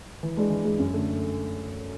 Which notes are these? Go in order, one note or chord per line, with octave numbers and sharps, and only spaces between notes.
E3
G#3 D4 G#4
E3
G#3 D4 G#4
F#2
D3 A3